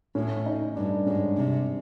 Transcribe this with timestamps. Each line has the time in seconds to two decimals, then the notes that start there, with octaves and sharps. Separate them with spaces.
0.15 A2 C#4
0.46 D#4
0.76 G2 D4
1.07 G#2 C#4
1.37 C3